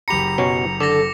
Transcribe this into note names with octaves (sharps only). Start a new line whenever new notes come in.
F#1 G4 A#5 B5 C#7 F7
B2 F#3 C#4
D3 A4 D6 A#6